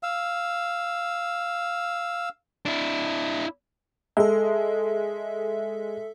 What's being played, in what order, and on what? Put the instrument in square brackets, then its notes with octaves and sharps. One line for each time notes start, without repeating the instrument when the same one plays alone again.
[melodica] F5 E6
[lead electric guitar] D4 E4
[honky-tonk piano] G#3 [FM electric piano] A4 E5